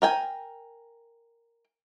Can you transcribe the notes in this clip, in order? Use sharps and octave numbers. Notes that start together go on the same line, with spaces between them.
A#4 G5 G#5